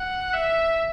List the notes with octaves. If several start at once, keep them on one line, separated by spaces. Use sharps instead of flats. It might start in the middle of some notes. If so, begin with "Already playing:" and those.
Already playing: F#5
E5